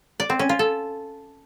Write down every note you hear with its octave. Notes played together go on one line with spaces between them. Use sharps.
D5
C4
C#4
F4
A4